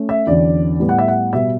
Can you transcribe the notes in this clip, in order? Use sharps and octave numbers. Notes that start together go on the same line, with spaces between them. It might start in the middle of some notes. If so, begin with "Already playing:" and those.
Already playing: A3 C#4
E5
E2 D3 F#3 C#4 D5
A2 G3 B3
F#5
E5
F#5
B2 G3 B3 E5